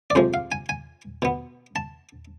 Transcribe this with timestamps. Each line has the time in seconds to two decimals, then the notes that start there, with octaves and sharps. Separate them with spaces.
0.10 D5
0.15 F2 C3 F3 G#3 C5
0.34 F5
0.52 G#5
0.69 G#5
1.22 B2 B3
1.76 A5